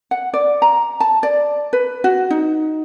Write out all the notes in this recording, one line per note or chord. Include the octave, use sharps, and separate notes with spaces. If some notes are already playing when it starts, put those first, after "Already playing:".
F#5
D5
A#5
A5
D5
B4
F#4
D#4